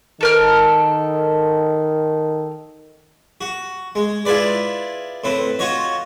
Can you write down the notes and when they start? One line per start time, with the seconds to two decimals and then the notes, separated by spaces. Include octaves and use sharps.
0.21 D#3 A4 A#4 F6
3.41 F#4
3.95 G#3
4.25 E4 F4 G#4 B4 D5
5.24 A2 C4 B4
5.59 F4 F#4 C#5 D#5